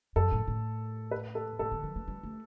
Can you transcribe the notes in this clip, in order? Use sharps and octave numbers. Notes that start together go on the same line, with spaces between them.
F#2 A4
A2
A2
B4
A4
A2 A4
D3
F#3
A3
G3
A3